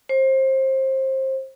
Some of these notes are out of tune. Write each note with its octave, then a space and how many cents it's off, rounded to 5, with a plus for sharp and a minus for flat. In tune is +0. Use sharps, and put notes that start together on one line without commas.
C5 +25